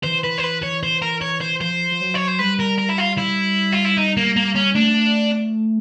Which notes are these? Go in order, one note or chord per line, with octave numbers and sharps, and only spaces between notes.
E3 C5
B4
C5
B4
C#5
C5
A#4
C#5
C5
F3 C5
F3
F#3
C#5
C5
G3 B4
A#4
A#4
E4
F4
E4
F4
E4
D#4
A#3
A#3
C#4
A3 D4